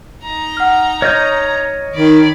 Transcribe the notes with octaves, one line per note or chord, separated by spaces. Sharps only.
D#4 A#5
F#5 F6
C#5 D#5 F6 G6
D#3 D5 B5